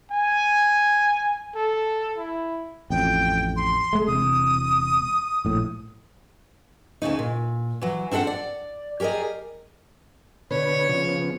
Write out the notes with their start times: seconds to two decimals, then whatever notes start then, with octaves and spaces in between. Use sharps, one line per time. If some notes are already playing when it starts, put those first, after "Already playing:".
0.11 G#5
1.55 A4
2.18 E4
2.90 A1 F2 G5
3.56 C6
3.93 G#3 A3
4.07 E1 C3 D#6
5.45 A#1 A2
7.02 D2 G#2 C#3 D#4
7.19 A#2
7.81 E3 F#3
8.11 C4 D4 A4 E5 F#5
8.27 D5
9.00 G4 G#4 A#4 D5 D#5
10.51 B2 D3 B4 C#5
10.89 C#3 F3 B3